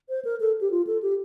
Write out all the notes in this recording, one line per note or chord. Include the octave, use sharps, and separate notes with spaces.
C5
A#4
A4
G4
F4
A4
G4